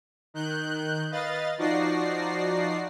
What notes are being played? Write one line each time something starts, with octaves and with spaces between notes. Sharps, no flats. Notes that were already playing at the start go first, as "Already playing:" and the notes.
D#3 F#6 G6
B4 D#5 F5 A6
F3 D#4 F#4 D5 A#6 C7